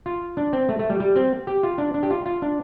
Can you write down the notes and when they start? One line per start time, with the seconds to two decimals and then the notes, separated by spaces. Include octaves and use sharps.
0.06 F4
0.37 D4
0.53 C4
0.69 A3
0.79 A3
0.90 G3
1.00 G3
1.16 C4
1.47 G4
1.63 F4
1.78 D4
1.94 D4
2.03 G4
2.10 F4
2.26 F4
2.42 D4